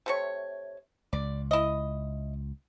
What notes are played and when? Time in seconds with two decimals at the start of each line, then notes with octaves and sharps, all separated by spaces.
0.06 C3 A3 C#5
1.13 C#2 D5
1.51 E4 D#5